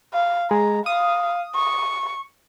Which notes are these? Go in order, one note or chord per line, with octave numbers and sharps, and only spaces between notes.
F5
G#3 A#5
F5 D#6
C#6